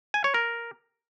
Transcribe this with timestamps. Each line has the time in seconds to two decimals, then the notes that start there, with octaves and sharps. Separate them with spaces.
0.14 G#5
0.24 C#5
0.34 A#4